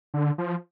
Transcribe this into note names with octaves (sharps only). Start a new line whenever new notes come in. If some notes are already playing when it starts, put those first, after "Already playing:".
D3
F3